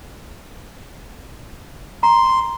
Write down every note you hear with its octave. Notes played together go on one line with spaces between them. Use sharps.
A#5 C6